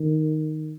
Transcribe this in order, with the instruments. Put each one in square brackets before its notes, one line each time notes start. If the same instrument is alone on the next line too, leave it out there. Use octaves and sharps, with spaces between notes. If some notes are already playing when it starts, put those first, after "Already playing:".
Already playing: [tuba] D#3